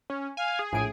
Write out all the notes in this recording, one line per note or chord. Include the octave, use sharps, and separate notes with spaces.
C#4
F5 G#5
G#4
A#1 A2 G#5 D7